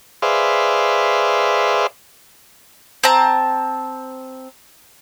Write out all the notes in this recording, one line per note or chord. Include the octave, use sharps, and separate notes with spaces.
G#4 B4 C5 D5 E5 F5
C4 A5 A#5